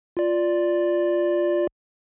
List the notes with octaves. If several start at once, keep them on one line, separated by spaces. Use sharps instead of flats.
F4 D5